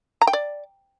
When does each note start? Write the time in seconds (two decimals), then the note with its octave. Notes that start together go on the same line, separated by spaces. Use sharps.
0.22 A#5
0.27 G5
0.33 D5